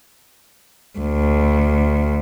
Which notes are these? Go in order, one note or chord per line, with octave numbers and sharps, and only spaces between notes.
D2